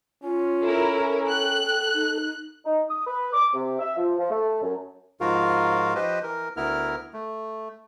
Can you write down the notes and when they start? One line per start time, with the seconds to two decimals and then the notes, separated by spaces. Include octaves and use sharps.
0.23 C#4 F4
0.62 E4 A4 A#4
1.27 G5 F#6
1.94 D#4
2.65 D#4
2.88 D#6
3.05 B4
3.32 D6
3.53 C3
3.79 E5
3.96 F3
4.18 F3
4.30 A3
4.61 F#2
5.21 G#2 F3 F4 F#4 A#4 F5
5.95 F3 G4 B4 C5 D#5
6.23 E3 A#4
6.57 D2 B3 E4 A#4 F6
7.13 A3